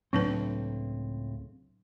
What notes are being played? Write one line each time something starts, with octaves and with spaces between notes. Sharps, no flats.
C#2 A2 F#3 C4 D4 B4